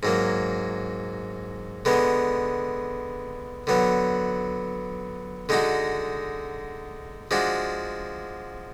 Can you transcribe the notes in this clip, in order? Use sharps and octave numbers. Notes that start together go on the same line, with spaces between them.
G#2 F#3 A#3
D3 G#3 B3
D3 F#3 B3
D3 G#3 D#4 F#4
F3 G#3 D4 F#4